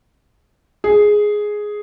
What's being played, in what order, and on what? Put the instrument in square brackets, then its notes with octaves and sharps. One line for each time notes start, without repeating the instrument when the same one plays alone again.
[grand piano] G#4